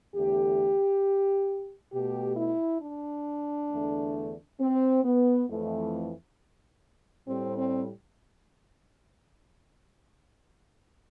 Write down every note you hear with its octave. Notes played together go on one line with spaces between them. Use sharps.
E2 D3 A3 G4
B2 A3 G4
E4
D4
E2 D3 A3
C4
B3
F2 E3 A3
A2 G3 C4
C4